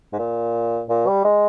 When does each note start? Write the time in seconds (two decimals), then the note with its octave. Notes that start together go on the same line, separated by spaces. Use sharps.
0.13 G#2
0.19 A#2
0.89 A#2
1.07 G3
1.24 G#3